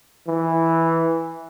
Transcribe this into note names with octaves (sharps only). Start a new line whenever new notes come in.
E3